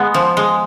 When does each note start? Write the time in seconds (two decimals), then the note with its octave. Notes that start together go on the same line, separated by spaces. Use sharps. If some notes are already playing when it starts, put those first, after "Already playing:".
Already playing: G#3 B3
0.14 F3
0.37 G#3